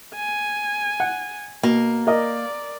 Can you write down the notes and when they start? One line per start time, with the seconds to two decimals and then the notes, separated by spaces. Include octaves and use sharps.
0.15 G#5
1.00 F#5
1.63 B2 A#3
2.07 A#4 D5 D#5